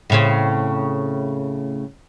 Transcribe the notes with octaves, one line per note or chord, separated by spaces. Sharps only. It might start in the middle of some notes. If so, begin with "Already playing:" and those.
A2 C#3 C4